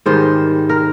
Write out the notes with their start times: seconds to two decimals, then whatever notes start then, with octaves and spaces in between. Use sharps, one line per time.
0.06 G#2 D#3 G3 C5
0.70 A#4